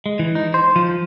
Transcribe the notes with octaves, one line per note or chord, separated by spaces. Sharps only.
G#3
E3
D#4
C5
F3